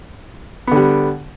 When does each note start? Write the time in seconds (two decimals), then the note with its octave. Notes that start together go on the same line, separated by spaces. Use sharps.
0.67 B3
0.71 D3
0.76 G3